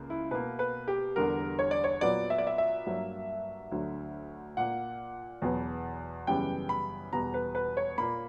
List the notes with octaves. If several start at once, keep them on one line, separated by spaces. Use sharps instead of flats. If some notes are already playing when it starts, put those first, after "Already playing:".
Already playing: C#2 A#3
E4
B2 A#3 B4
B4
G4
E2 D3 G3 A#4
C#5
D5
C#5
A#2 F#3 B3 D5
E5
D5
E5
E5
G2 F#3 A#3
D2 D3 F#3
A#2 A#3 F#5
E2 B2 F#3 B3
F#2 C#3 E3 G3 B3 G5
B5
E2 B2 G3 B3 A#5
B4
B4
C#5
A#2 A#3 B5